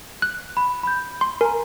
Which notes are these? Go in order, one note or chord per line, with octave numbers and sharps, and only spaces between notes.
F#6
B5
B5 G6
C6
A#4 G#5 A#5